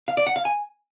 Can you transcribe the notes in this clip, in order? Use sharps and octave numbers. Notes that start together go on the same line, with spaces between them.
F5
D5
F#5
F5
G#5